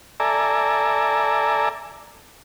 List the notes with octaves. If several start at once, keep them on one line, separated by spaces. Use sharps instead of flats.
A4 D5 E5 G#5 A#5